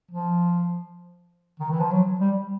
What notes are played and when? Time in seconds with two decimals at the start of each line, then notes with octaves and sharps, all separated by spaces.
0.11 F3
1.60 D#3
1.71 E3
1.80 F3
1.91 F#3
2.21 G3